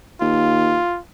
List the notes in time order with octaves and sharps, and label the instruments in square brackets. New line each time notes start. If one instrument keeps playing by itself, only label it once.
[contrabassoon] D#2 [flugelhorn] F4